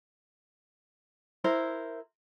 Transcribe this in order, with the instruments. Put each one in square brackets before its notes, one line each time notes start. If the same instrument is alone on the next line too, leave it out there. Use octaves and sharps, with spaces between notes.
[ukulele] E4 A#4 C5